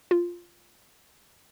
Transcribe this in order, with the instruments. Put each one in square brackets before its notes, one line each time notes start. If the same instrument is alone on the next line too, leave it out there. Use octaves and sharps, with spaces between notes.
[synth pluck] F4